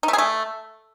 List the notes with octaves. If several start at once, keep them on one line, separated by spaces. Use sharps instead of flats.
D#4
A3
G#4
A3